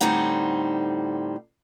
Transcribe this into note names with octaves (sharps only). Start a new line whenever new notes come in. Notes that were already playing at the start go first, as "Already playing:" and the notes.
A2 D3 G3 C4 D#4 F#5